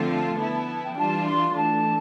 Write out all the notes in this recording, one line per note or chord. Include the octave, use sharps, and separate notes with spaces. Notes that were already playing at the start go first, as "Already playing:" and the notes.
Already playing: D3 F3 A3 C4 F4 A5
F3 B3 E4
G5
E3 G3 D4 F4 A5
C6
E3 A3 D4 A5